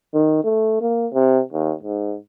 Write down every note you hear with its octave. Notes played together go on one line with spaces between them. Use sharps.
D#3
A3
A#3
C3
D#2
G#2